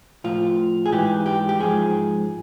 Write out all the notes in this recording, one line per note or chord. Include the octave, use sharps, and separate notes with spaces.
A2 F3 F4
G#4
G#2 E3 G4
G4
G4
G#2 F3 G#4